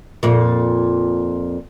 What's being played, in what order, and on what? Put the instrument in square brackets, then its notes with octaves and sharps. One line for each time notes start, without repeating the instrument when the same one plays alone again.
[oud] F2 A#2